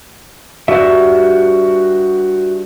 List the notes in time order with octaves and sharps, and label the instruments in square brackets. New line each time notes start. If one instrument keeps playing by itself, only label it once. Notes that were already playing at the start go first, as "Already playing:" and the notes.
[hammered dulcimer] G2 D5 [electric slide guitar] F#4 E5